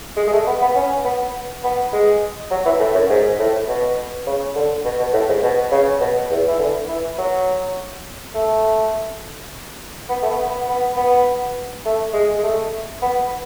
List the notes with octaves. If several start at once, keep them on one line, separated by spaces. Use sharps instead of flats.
G#3
G#3
A3
B3
B3
C#4
B3
B3
G#3
F#3
E3
A2
F#2
G#2
A2
B2
C#3
D3
B2
B2
A2
G#2
B2
C#3
B2
E2
E3
D3
E3
F#3
A3
B3
A3
B3
B3
B3
B3
A3
G#3
G#3
A3
B3